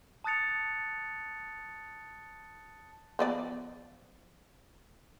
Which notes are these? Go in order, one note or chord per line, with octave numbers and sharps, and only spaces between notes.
A5 D#6 F#6 A6 C#7 F7
F3 B3 D5